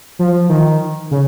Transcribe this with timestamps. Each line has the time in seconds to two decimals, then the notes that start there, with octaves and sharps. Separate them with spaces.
0.19 F3
0.49 D#3
1.11 C#3